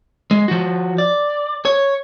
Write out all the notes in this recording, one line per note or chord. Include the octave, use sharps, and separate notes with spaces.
G#3
F3 F#4
D5
C#5